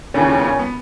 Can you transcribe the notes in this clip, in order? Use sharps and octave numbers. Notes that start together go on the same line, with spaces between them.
D#2 C#3 E3 C#4
C#4
B3
C#4
B3